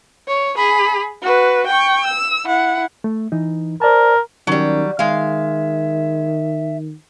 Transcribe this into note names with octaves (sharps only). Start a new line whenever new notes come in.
C#5
G#4 B5
F#4 B4
G5 C#6
E6
E4 F#5
A3
E3 D#4
A#4 C5 D5 A5
D#3 F#3 G3 C#4
D#3 G#3 E5 F5